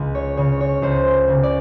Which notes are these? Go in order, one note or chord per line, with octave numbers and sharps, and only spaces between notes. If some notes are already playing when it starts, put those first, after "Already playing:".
Already playing: C#2
C#5
C#3 C#5
C#5
C#2 C5
C#3
D5